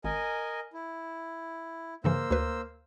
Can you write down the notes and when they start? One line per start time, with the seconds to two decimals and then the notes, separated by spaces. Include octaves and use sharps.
0.04 G#1 A#4 D#5 G#5
0.73 E4
2.04 G2 C#3 E3 A#3 C5 E6
2.31 D2 B4